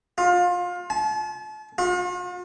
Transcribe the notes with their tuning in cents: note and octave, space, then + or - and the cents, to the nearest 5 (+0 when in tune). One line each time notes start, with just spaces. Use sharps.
F4 +25
A5 -40
F4 +45